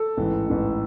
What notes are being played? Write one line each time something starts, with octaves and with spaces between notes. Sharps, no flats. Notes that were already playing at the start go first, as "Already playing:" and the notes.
Already playing: A4
A1 G#2 E3
A1 G#2 E3